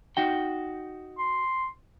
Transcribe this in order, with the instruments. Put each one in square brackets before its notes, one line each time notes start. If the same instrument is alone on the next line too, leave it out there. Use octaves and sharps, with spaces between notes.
[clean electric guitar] D#4 F#4 G5
[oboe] C6